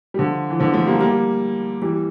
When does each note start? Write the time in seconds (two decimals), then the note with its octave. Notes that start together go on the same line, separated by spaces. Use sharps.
0.14 G3
0.19 D3 F3
0.50 E3
0.59 D3 F3
0.74 F3 A3
0.87 G3 A#3
1.00 G3 A#3
1.82 E3 G3